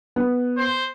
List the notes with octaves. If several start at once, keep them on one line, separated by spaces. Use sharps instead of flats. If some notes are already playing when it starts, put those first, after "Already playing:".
B3
C5